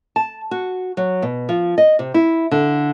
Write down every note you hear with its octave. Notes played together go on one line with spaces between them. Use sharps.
A5
F#4
F#3
B2
F3
D#5
C3
E4
D3